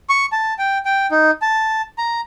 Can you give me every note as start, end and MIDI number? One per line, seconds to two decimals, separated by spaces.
0.09 0.26 85
0.32 0.54 81
0.59 0.78 79
0.85 1.06 79
1.11 1.31 63
1.42 1.82 81
1.98 2.21 82